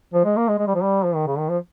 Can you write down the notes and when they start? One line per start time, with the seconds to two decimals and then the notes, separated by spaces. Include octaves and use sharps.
0.14 F3
0.25 G#3
0.37 A#3
0.48 G#3
0.58 G#3
0.67 G3
0.74 F3
0.82 G3
1.04 F3
1.15 D#3
1.27 C#3
1.38 D#3
1.49 F3